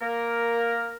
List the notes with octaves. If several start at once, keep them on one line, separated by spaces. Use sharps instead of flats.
A#3 A#4